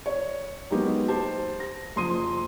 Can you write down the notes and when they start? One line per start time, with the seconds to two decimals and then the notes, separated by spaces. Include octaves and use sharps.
0.06 C#5
0.71 F#3 G#3 A#3 B3 D#4 G4
1.08 G4 C5 A5
1.60 A#6
1.96 F#1 F3 C6 D#6 D#7